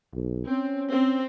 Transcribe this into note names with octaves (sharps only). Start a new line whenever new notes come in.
B1
C4 C#4
C4